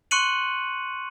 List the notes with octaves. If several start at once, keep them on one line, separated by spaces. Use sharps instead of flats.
C6 C#6 F#6 C#7 D#7 F#7